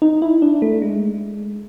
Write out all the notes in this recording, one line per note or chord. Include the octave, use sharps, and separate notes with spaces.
D#4
E4
D4
A3
G#3